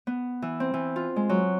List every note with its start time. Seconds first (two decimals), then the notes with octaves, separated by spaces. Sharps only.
0.07 B3
0.42 E3
0.60 C4
0.74 E3
0.96 F4
1.16 G#3
1.29 F#3